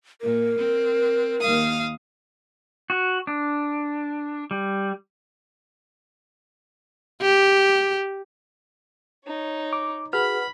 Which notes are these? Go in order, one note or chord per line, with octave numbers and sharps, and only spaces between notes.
A#2 A#4
C4
D#2 F5 D#6
F#4
D4
G3
G4
D#4 C#5
D6
F#4 G#4 B4 F#5 B5 F6